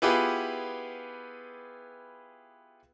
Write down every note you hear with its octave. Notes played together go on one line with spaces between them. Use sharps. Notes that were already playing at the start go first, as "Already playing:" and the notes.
B3 E4 F4 G4 G#4 B4